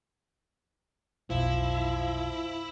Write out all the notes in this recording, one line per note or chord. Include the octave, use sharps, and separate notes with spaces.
F1 B1 F3 E4